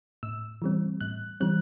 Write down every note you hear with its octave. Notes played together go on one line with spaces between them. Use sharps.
A2 E6
E3 G3 C4
A2 F#6
E3 G3 C4 F#6